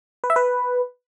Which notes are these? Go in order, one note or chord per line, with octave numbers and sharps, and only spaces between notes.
B4
E5
B4